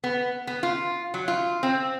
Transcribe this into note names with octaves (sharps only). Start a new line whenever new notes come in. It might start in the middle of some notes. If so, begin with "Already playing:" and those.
B3
B3
F4
F#3
F4
C4